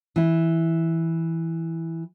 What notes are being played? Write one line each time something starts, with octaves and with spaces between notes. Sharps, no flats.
E3 E4